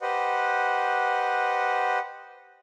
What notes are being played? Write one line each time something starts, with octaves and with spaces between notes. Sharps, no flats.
G4 B4 C5 D#5 F#5